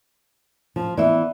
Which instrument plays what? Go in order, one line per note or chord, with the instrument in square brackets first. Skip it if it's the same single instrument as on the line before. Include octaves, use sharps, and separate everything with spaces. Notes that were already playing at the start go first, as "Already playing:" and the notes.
[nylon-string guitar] F3
[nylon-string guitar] E3 B3 [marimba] D5 E5